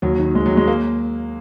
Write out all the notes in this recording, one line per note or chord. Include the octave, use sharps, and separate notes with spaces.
D#2 F#3
D#3
D#2 G#3
F#3
D#3
G#3
A#3